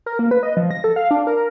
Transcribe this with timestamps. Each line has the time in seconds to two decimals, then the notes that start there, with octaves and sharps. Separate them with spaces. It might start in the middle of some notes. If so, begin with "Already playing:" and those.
0.06 A#4
0.19 A#3
0.31 B4
0.43 D#5
0.57 F3
0.71 A#6
0.84 A4
0.96 F5
1.11 D4
1.27 A#4